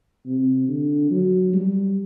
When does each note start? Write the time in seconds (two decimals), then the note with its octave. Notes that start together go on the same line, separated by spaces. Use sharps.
0.26 C3
0.68 D3
1.11 F#3
1.53 G3